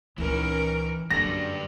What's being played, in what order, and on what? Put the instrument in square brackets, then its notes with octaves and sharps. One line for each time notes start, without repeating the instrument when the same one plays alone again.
[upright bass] C#2 A#2 [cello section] D#3 C#4 A#4 [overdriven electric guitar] E3
[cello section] F#2 D3 [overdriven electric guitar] G3 D4 [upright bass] G#3 A#3 [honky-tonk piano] A#6